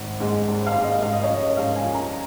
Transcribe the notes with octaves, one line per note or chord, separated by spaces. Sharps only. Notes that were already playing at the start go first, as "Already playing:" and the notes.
Already playing: G#1
G#2 G#3
G#1
F5
G#2 G#3
D#5
G#2 F5
D#5
C#5
F3 C#4 F4 D#5
G#2 F5
G#5
F3 C#4 F4
A#5